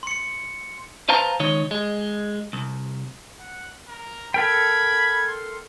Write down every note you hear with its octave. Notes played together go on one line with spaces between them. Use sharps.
C6 C#7
B4 C5 F5 A5 A#5
C#2 D#3 D#4 C#5
G#3
C2
F#5
A#4
A4 A#4 G5 B5 G#6
C6